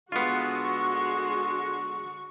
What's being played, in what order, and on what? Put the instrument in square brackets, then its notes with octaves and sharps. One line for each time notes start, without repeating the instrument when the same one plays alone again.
[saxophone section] D3 G#3 [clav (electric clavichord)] B3 F4 [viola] F#4 [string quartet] C#6